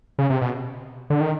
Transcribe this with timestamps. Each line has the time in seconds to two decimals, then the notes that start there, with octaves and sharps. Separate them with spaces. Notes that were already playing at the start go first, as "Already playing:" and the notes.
0.19 C#3
0.30 C3
0.41 B2
1.10 D3
1.21 D#3